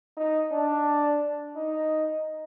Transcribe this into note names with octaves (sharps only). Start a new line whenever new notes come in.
D#4
D4
D#4